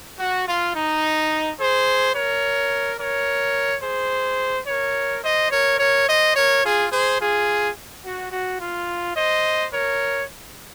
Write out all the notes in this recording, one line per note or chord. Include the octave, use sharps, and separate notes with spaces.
F#4
F4
D#4
G#4 C5
A#4 C#5
A#4 C#5
G#4 C5
A#4 C#5
C5 D#5
A#4 C#5
A#4 C#5
C5 D#5
A#4 C#5
F4 G#4
G#4 C5
F4 G#4
F#4
F#4
F4
C5 D#5
A#4 C#5